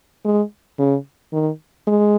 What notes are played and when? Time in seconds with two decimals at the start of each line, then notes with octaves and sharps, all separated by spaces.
0.25 G#3
0.79 C#3
1.33 D#3
1.87 G#3